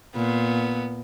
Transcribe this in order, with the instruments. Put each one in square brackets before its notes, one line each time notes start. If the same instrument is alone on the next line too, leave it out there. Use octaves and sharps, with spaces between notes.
[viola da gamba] A#2 [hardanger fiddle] B3